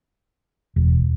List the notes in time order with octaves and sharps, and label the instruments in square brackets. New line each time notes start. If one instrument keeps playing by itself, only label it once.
[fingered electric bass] E1